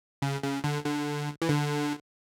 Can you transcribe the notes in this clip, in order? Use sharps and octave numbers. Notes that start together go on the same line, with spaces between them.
C#3
C#3
D3
D3
E3
D3